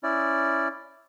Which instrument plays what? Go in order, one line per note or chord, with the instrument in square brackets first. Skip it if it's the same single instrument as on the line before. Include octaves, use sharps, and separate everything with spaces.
[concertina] C#4 E4 D5